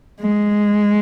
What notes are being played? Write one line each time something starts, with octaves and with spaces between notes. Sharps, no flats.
G#3